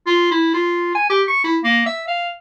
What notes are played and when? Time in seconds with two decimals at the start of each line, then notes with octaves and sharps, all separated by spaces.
0.06 F4
0.31 E4
0.54 F4
0.95 G#5
1.09 G4
1.28 C#6
1.44 E4
1.64 A#3
1.86 E5
2.07 F5